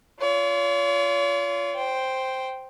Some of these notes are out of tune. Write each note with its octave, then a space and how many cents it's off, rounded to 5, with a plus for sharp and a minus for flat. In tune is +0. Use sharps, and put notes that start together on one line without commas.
F4 -15 C#5 +45
C5 +0 G5 +0